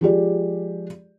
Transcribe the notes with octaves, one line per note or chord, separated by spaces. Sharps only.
F3 G#3 G4 D5